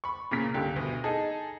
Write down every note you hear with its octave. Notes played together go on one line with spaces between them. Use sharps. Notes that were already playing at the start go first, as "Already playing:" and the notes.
B5 C#6
A#2 C#3 A#4 B6
C#2 D3 G4
D2 B2
D#4 G#4 A4